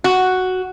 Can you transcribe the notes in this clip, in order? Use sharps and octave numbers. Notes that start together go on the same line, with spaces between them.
F#4